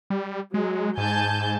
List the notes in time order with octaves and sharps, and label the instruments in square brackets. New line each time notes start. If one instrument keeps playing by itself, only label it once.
[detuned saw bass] G3
[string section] F#3 [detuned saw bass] G#3
[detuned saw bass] G#2 [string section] G#5 A5 G6